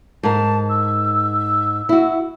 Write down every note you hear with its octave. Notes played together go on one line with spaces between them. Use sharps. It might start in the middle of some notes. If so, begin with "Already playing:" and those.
G#2 A#4 A5
E6
E4 F#4